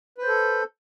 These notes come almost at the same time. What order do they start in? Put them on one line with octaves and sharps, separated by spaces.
B4 C5 A4